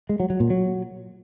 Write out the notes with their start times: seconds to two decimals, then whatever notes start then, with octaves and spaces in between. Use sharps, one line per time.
0.09 G#3
0.20 F#3
0.30 F#3
0.40 A#2
0.50 F#3